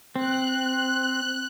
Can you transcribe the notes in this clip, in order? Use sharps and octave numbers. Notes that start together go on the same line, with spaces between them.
C4 F#6